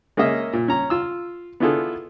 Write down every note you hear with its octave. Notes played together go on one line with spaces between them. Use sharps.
G#3 A#3 C#4 D#5 E5
A#2
C#4 A#5
F4 E6
B3 D4 E4 F4 G#4 A4